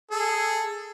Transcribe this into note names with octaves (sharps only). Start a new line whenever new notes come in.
G#4 A4